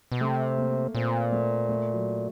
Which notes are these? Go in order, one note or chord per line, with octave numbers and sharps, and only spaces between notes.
B2
C3 A3
A#3
A#2 C4
A3
A3
F#3